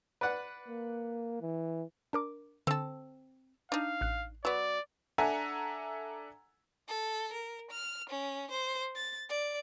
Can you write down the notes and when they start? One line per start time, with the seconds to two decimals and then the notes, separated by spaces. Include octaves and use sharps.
0.21 B4 D5 F#5
0.68 A#3
1.42 E3
2.13 D4 A#4 D6
2.67 D3 C4 A4
3.72 D4 D#4 F5
4.01 A1 F#6 C7
4.45 F#3 B3 D5
5.18 D4 A4 E5 F#5 G#5 A#5
6.88 A4
7.33 A#4
7.71 F6
8.10 C#4
8.51 C5
8.95 A6
9.29 D5